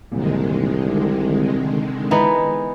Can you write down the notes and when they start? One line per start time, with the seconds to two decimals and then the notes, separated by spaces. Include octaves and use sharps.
0.12 C2 F#2 A#2 D3 D#3 G#3
0.89 C3
2.11 E3 B3 D#4